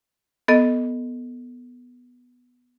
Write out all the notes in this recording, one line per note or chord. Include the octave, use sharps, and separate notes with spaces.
B3 A4 D#5